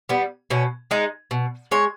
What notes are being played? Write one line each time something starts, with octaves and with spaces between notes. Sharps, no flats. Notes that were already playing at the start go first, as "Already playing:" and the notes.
G3 B3
B2 C#4
G#3 D#4
B2
G#3 C#5